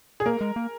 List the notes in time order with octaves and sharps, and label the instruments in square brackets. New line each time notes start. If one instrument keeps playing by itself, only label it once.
[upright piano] G#4
[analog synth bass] A#3 [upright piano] A#4
[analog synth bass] G#3
A#3